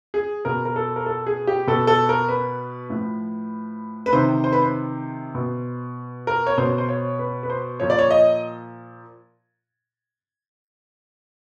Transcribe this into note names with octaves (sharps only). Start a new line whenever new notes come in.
G#4
B2 A#4
A#4
A4
A#4
A4
G#4
G4
B2 A4
A4
A#4
B4
A2 F3
B4
C3 D#3 C5
C5
B4
C5
B2
A#4
C#5
B2 C5
C5
C#5
B4
B4
C5
A#2 F3 C#5
D5
C#5
D#5